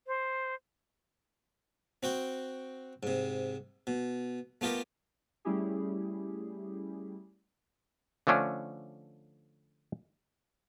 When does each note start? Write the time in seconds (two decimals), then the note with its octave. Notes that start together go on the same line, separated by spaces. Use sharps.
0.07 C5
2.03 C4 F#4 G5
3.03 G#2 C3
3.87 B2
4.61 A3 B3 F4 G4 A#4
5.45 G3 A3 C#4 E4 G4 G#4
8.27 D3 F3 A3 C#4 D4